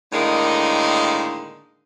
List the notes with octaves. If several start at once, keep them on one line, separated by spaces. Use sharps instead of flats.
A2 D3 D#3 G#3 A#3 D#4